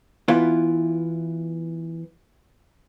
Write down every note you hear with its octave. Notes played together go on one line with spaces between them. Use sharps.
E3 B3 E4 F4